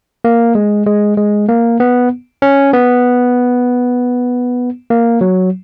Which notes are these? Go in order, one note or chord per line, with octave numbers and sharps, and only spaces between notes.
A#3
G#3
G#3
G#3
A#3
B3
C#4
B3
A#3
F#3